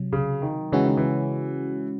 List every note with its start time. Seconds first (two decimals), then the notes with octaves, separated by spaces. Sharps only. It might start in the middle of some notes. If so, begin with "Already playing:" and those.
Already playing: C3 F#3
0.13 C#3
0.42 D#3
0.72 C#3 E3 G#3 C#4 F#4
0.85 D#3
0.97 E3